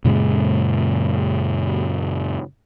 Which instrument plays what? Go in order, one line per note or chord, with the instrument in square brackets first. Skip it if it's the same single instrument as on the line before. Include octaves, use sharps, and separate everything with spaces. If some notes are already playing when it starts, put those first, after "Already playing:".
[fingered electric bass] F#2 A#2 C#3 G#3